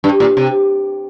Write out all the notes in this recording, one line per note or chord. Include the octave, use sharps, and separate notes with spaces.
G2
A#2
C3